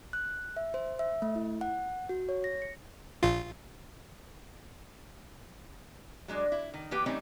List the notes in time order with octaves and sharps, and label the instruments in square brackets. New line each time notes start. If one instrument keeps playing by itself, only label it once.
[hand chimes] F#6
E5
C5
E5
A3
E4
F#5
F#4
C#5
A#6
C#7
[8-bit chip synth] A#1 F4
[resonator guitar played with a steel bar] F#3 G#3 D4
E4
D#3
E3 A#3 G4 B4 G5
E3 G3 A3 C4 C#4 D#4